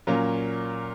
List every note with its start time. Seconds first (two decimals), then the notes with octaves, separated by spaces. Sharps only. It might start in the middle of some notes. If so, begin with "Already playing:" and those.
0.07 A#2 F#3 A#3 C#4 F4